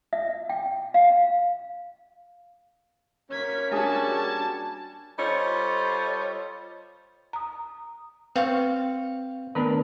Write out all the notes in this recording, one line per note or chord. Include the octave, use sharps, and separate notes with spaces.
E5
G5
F5
A#3 C#4 G#6 B6
G3 D4 F#4 G#4 G#5 A5 G#6
G3 F4 A4 C5 C#5 D#5
A#5 D#6
C4 B4 F5 C#6
D#3 A3 B3 D4 A#4 B4